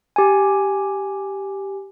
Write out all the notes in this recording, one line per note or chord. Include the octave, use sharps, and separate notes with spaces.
G4 G#5